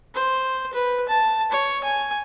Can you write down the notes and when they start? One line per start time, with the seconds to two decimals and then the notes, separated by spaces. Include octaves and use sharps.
0.14 C5
0.73 B4
1.08 A5
1.51 C#5
1.84 G#5